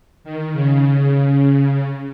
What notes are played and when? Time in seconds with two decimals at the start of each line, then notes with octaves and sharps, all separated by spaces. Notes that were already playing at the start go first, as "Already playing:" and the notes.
0.24 D#3
0.53 C#3